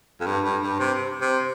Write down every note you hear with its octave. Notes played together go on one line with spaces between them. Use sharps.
F2
G2
G2
G2
C3
C3